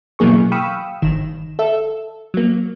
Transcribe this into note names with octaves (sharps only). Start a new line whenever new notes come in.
B2 E3 F#3 A#3 G#4 C#6
F5 G5 B5 C#6 D#6 E6
G1 D#3 E7
A4 E5
F#3 A#3